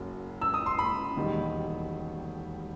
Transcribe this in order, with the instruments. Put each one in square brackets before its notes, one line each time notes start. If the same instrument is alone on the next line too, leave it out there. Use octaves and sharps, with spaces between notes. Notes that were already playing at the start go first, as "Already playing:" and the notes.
Already playing: [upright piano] F#1 F#2 F#3
E6
D#6
C6
B5
E1 D#2 D#3 G3